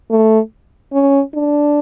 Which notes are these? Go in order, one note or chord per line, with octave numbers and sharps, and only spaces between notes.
A3
C#4
D4